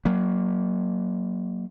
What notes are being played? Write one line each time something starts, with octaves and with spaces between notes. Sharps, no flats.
F#3 A#3